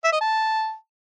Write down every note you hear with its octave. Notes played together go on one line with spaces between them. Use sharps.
E5
D#5
A5